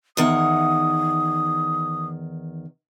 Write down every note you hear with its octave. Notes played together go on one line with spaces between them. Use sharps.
E2 D#3 F#5 D#6